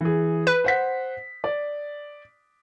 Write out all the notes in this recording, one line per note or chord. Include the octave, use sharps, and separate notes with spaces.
E3 G#4
B4
C5 F#5 B6
D5